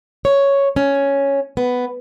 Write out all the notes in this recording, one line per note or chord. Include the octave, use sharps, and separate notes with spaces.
C#5
C#4
B3